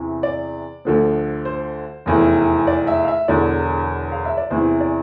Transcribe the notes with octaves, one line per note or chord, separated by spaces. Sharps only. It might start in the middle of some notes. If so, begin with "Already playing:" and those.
Already playing: E2 C3 E3
D5
D2 D3 F3
C5
F1 E2 E3
D5
E5
F5
E5
E1 E2 D3 D5
F5
E5
D5
E2 C3 E3 C5
D5